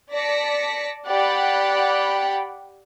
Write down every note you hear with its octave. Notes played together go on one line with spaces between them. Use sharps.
D5 A5 A#6 B6 C#7
G4 D5 F#5 G5 B5 F#6